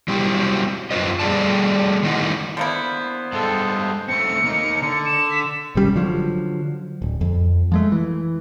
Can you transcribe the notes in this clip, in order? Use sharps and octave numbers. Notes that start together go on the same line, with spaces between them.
F#3 G3 C4 E4 G4
F#2 F4 B4 C5 D#5
G3 A3 G#4 D5 F#5 A5
D#3 A3 D#4 E4 F#5
D3 A#3 B3 E4 C5
G2 G#3 A4
A3 C4 C#7
A#3 D#4
D3 C#7
E7
B6
G#1 C3 G3 C#4
D3 F3 F#3
D1
F2
F3 G#3 A3
E3